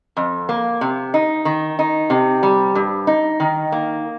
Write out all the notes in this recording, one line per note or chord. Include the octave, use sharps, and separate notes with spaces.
F2
A#3
C3
D#4
D#3
D#4
C3
G3
G2
D#4
D#3
A#3